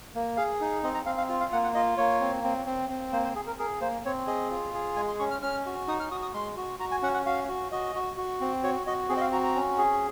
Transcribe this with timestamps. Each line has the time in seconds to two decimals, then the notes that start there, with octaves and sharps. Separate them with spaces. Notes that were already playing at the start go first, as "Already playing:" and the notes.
0.15 A#3
0.37 G#4 F5
0.61 D#4
0.83 C4 D#5
0.94 A#5
1.06 C4 F5
1.18 F5
1.29 F4
1.40 F5
1.52 A#3 F#5
1.64 F#5
1.75 F4 D#5
1.98 A#3 C#5
2.21 C4
2.44 C4
2.66 C4
2.89 C4
3.12 A#3 C5
3.24 C5
3.36 G#4
3.47 A#4
3.59 G#4 A#4
3.81 A#3 C5
4.05 C4 C#5
4.27 G#4 D#5
4.51 F4
4.74 G#4
4.96 G#3 G#5
5.08 C6
5.19 C#4 C#6
5.31 F6
5.42 C#4 F6
5.66 F#4
5.88 D#4 D#6
6.00 F6
6.11 F#4 D#6
6.22 D#6
6.34 G#3 C6
6.57 F#4
6.79 F#4 A#5
6.91 G#5
7.02 C#4 F#5
7.14 F#5
7.26 F#4 F5
7.48 F#4
7.72 F#4 D#5
7.95 F#4
8.17 F#4
8.41 C4
8.63 F#4 C#5
8.87 F#4 D#5
9.09 C4 G#4
9.17 D#5
9.21 F5
9.33 F#4 A#5
9.43 A#5
9.55 C#4
9.78 G#4